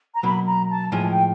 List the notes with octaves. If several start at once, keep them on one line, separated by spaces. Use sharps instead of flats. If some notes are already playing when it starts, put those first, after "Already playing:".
A#5
B2 F#3 A#3 B5
A#5
A5
A2 F3 G#3 G#5
G5